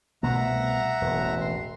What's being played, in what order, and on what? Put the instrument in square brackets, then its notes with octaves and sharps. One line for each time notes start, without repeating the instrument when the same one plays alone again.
[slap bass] C2 B2 A3 [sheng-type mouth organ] E5 F#5 A#5
[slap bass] E1 A1
[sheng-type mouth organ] C6